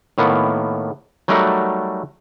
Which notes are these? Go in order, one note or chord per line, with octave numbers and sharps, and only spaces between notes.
A2 D#3 A#3 B3
F#3 G3 A3 D#4 A#4 F#5